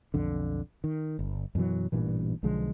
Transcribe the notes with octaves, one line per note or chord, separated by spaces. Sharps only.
B1 F2 D3
D#3
G1
F#2 B2 E3 F#3
A1 G2 A#2 E3
B1 D3 F3 G#3